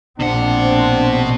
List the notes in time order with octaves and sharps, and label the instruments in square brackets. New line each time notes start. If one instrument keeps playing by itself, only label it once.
[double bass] A#1 C4 [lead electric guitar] B2 F#5 [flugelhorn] D4 [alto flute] C5